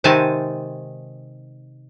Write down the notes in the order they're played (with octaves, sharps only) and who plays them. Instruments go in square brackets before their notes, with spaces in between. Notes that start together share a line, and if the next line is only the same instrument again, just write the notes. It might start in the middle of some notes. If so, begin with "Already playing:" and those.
[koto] C3 D#3 G#3 C4 G#5 A5